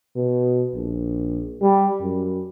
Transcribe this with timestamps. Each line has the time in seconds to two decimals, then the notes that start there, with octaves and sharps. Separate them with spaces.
0.16 B2
0.75 A#1
1.62 G3
2.01 F#2